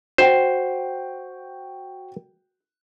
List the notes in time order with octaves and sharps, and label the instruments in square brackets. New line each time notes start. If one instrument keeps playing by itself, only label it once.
[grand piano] F#4 G5 [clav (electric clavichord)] C5